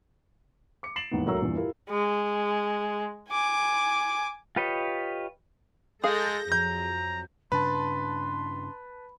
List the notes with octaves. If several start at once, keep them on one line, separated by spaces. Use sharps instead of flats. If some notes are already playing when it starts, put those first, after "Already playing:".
D6 C#7
A6 C7 D7 E7 F#7
D#2 G#2 E3 B3
D2 F#3 A#4 C#5 A#5 E6
E2 G2 A#2
E4 F4 G4 A#4
G#3
G#5 D6
F4 G4 B4 C#5 D#5
G#3 G#4 A4 F5 G6 A#6
F2 F#3 A#5 G6
G2 C#3 D4 B4 A5 B5 C6